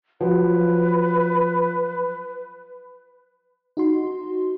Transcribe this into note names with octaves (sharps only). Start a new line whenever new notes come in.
F3 F#3 B4
D#4 F#4 C6